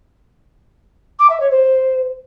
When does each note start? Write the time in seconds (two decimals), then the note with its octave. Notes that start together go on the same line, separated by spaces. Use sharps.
1.19 D6
1.29 E5
1.39 C#5
1.50 C5